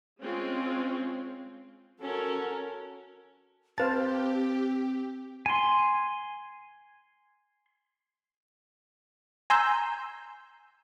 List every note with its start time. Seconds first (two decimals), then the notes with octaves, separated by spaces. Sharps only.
0.22 G#3 C4 C#4 F4
2.01 C#4 F#4 A4 A#4
3.78 C4 G4 B4 C5 F5 A5 A6
5.46 G#5 C6
9.50 G#5 A#5 C6 E6 G6